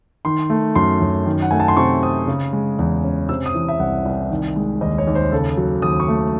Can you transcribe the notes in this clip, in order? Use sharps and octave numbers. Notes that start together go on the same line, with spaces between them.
D#3 C6
A3
F#2 C6
F#2
D#3
F#5
A3 G#5
A5
C6
C3 C#6
C4 D#6
C#3
G#3
E2
C#4
C3 E6
D#6
E3
E5
C2 F#5
C2
D#3
G#3
D#2 D#5
C#5
D#2
C5
C#3 A4
F#3
D#2 D#6
C#6
A3